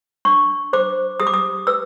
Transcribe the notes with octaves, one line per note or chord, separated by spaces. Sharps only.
D4 C#6
C5 D6
G4 D#6
D6
D#6
B4 E6